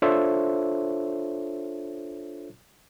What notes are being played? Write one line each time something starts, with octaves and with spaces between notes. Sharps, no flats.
D4 F4 A4 C5 C#5 E5